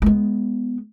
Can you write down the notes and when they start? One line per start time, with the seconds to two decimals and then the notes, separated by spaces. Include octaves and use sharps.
0.02 G#3 B3